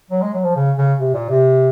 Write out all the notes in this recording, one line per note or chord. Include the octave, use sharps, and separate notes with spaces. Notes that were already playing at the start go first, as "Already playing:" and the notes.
F#3
G#3
F#3
F3
C#3
C#3
C3
A#2
C3